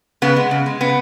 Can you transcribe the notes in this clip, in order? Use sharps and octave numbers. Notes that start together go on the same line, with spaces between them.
C#3 B3
G#3
C#3
G#3
C#3 B3